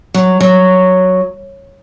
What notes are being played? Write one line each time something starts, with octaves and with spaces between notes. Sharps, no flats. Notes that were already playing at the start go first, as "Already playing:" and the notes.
F#3
F#3